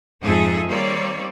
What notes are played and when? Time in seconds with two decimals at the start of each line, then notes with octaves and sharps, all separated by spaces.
0.22 F2 G#2 D#4 G#4 A4 E5
0.68 D#3 G3 A#3 C4 C#5 D5